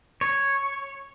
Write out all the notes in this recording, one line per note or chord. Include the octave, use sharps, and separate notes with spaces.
C#5